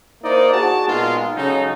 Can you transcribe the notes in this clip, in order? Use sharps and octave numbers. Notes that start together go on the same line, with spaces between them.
A#3 D#4 E4 C5 D5 D#5
F#4 G#4 A5
A#2 G#3 B3 D#4 F4
C#3 F#3 G#3 C#4 D#4 A4